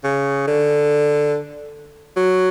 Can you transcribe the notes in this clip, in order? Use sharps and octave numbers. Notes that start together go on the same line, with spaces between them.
C#3
D3
F#3